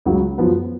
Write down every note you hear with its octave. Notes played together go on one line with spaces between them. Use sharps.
C#2 C#3 F#3
F#2 F3 B3 F#4